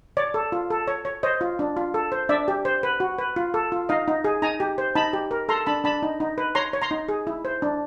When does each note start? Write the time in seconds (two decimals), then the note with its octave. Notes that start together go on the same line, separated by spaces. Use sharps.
0.17 C#5 D5
0.34 A4
0.52 F4
0.70 A4
0.88 C#5
1.05 C#5
1.23 C5 C#5 D#5
1.41 F4
1.59 D4
1.77 F4
1.94 A4
2.12 C5
2.29 D4 D5 E5
2.48 G4
2.65 C5
2.83 B4
3.00 F#4
3.18 B4
3.36 F4
3.54 A4
3.72 F4
3.89 D#4 D#5 F5
4.08 D#4
4.24 G#4
4.42 D#4 G#5 A#5
4.60 G4
4.78 C5
4.95 D#4 A5 B5
5.13 G4
5.31 A#4
5.49 A4 A#5 C6
5.66 D4 A5 B5
5.84 D4 A5 B5
6.03 D#4
6.20 D#4
6.38 B4
6.55 C#5 A#5 C6
6.73 C#5
6.82 A#5 C6
6.91 D#4
7.09 G#4
7.27 E4
7.45 C5
7.62 D4